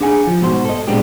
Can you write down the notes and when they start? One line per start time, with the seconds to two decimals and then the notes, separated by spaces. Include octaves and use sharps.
0.01 D4 G#4 F#5 G#5
0.27 F3
0.41 G#2 B2 F#4 G4 C5
0.65 A4 D#5
0.87 A#2 G#3 B3 C4 D4 G4